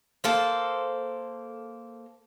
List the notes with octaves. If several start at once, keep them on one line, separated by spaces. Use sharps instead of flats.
A#3 A4 C5